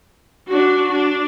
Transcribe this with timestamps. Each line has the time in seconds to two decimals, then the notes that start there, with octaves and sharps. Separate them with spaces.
0.48 D4 F#4
0.93 D4